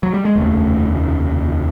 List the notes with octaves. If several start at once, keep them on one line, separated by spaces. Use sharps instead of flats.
F#3
G3
G#3
F1 D#2 C#3 A3